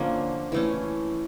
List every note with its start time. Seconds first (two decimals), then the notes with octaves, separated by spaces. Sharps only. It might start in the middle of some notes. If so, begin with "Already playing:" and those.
Already playing: D3 F3 A#3 C#4
0.52 E3 A3 C#4